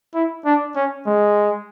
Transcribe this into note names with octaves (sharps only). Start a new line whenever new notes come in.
E4
D4
C#4
G#3